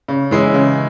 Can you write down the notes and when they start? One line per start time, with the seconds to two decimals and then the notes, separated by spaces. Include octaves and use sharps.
0.08 C#3
0.31 E3 G#3 C#4 E4
0.54 C#3